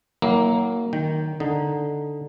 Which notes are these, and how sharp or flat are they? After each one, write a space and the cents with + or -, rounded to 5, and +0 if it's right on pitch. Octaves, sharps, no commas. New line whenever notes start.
F#3 +20 A#3 +0 E4 -35
D#3 +0 G5 +0
D3 +0 D#4 +0